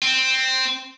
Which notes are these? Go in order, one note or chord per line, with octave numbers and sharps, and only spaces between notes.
C4